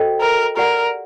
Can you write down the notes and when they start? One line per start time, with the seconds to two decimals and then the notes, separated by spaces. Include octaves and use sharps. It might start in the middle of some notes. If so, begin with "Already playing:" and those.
Already playing: F#4 A4 C5 D#5 G5
0.21 A#4
0.57 G4 A#4 D5 F#5